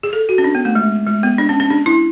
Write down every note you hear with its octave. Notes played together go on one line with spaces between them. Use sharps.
G#4
A4
F#4
C#4
D4
B3
A3
G#3
G#3
B3
D4
C#4
C#4
D4
E4